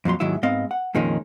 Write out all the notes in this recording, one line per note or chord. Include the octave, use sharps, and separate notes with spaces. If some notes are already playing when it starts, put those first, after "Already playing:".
F2 A#2 F#3 C6
D#2 G#2 D#3 F#3 E4 E5
G#2 B3 C4 D#5 F5
F#5
F2 A#2 D#3 F3 G#3 C#4